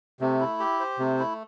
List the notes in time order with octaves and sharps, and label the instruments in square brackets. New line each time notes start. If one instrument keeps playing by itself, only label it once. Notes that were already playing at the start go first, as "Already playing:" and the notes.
[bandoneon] C3 [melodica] A3
[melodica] E4
G4
C5
[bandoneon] C3 [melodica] A3
[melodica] E4